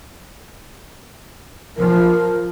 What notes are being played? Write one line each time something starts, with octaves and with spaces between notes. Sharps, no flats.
F3 A#4